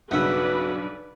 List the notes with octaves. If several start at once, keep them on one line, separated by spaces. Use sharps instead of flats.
B1 G2 C#3 B3 F#4 B4 D5 E5